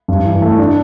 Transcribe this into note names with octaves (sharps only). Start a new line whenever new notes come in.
G2
E3
A3
D4